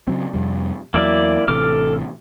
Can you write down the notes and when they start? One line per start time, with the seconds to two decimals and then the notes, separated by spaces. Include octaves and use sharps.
0.08 C#3 F#3 C4
0.34 F2 C3 G3
0.94 E2 F#3 A#3 E4 D5
1.48 A1 C3 E3 A4 D6 F6